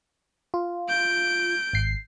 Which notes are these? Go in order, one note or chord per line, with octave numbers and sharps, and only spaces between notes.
F4
G6 D7
G#1 C7